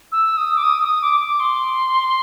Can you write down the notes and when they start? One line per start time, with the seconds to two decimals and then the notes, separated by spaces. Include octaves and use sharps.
0.12 E6
0.37 D#6
0.57 D6
0.64 D#6
0.82 D#6
1.02 D6
1.20 D6
1.40 C6